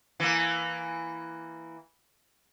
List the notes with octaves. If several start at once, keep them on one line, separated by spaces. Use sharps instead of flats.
E3 A#3